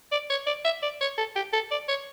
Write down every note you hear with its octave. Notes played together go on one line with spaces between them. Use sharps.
D5
C#5
D5
E5
D5
C#5
A4
G4
A4
D5
C#5